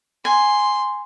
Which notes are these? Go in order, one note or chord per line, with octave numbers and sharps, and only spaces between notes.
G#5 C6